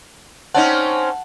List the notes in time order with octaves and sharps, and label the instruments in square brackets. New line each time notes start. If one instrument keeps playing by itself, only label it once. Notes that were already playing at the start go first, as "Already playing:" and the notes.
[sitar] C4 C#4 D#4 [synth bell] F#5 A5